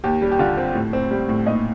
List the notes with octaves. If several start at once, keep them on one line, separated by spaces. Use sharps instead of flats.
D#2 G4
G3
G4
D3 F4
C4
A2
C4
G3
A2
A#2 D#4